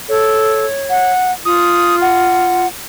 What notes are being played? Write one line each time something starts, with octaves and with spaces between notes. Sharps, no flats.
A4 C#5
F#5
F4 D#6
F#5